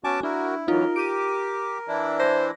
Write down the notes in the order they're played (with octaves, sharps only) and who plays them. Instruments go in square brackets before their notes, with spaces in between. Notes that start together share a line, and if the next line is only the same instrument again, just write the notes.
[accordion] B3 F#4 [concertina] C#4 A5 D6 [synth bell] G#5
[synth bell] D4 [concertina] E4 [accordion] F#4 A#4
[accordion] F#2 E3 F#3 [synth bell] D#4 F4 [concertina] A#4
[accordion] G4 [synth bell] D7 D#7
[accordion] E3 D4 E4
[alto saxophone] C5 [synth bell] A#6